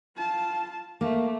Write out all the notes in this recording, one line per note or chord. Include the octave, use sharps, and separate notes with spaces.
F4 A5
A3 A#3